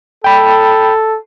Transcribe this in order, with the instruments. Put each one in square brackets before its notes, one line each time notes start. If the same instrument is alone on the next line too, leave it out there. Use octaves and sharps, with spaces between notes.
[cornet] A4 [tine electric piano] G5 B5